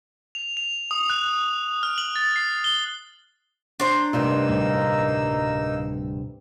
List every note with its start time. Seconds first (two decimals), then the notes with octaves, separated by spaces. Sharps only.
0.35 F7
0.57 F7
0.91 D#6
1.10 F#6
1.83 F6
1.98 F#7
2.16 A6
2.36 C7
2.64 G7
3.80 D4 C5 A#5
4.13 D2 G2 C3 A#3 D#4 E6
4.49 D1 A2 G3